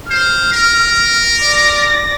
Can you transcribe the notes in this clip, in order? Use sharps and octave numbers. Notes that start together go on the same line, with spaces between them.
C5 F6
A#4
D5 A#6